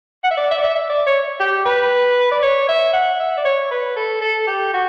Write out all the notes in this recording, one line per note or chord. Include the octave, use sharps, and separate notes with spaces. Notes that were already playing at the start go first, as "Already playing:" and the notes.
F#5
E5
D5
E5
D5
E5
E5
D5
C#5
G4
B4
D5
C#5
E5
F#5
E5
D5
C#5
B4
A4
A4
G4
F#4